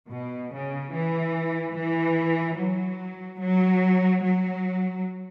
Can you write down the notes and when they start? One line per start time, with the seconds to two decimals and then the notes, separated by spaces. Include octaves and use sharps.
0.11 B2
0.52 C#3
0.93 E3
1.75 E3
2.58 F#3
3.41 F#3
4.22 F#3